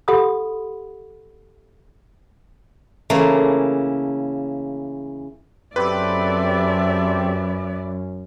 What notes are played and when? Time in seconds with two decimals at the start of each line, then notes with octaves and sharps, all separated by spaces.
0.08 G4 A4 F#5 B5 C6 D#6
3.10 C#3 E3 A3 A#3
5.76 F#2 C4 G4 A4 B4 D5 E5